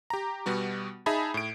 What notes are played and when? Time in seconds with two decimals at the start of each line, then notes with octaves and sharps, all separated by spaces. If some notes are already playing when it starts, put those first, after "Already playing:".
0.10 G4 A#5
0.46 B2 G3 B3 F#4
1.06 D#4 G#4 E5 G#5 A5 B5
1.34 A2 D7